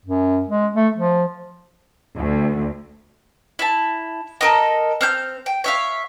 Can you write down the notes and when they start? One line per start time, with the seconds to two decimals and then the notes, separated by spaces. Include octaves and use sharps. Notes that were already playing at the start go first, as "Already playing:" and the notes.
0.05 F#2
0.48 G#3
0.75 A3
0.96 F3
2.16 D2
3.59 E4 A5
4.41 A4 A#4 D#5
5.01 C4 F6 G6
5.46 G5
5.64 C#5 E5 F5